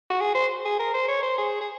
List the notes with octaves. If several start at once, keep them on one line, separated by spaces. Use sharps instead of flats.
F#4
G#4
C5
G#4
A#4
C5
C#5
C5
G#4
G#4